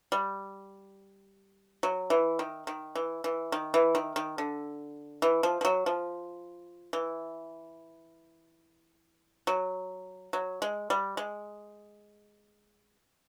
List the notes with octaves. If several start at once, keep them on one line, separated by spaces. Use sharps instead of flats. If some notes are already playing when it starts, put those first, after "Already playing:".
G3
F#3
E3
D#3
D#3
E3
E3
D#3
E3
D#3
D#3
D3
E3
F3
F3
F#3
F3
E3
F#3
F#3
G#3
G3
G#3